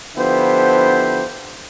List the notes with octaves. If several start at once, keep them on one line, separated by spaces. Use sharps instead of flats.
D3 F3 B3 E4 G4 C5